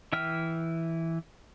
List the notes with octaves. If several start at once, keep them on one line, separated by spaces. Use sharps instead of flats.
E3 E5 G5 F6